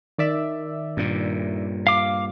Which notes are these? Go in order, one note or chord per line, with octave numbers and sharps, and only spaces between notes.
D#3 D5 E5
G2 A#2
F5 D6